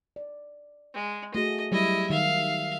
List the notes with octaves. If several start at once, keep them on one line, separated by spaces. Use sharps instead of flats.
D5
G#3
A3 F#4 G#4 D#5
F#3 G3 E4 G4 D#5
D#3 E5 F5